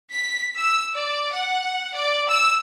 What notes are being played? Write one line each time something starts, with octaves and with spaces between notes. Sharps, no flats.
B6
E6
D5
F#5
D5
E6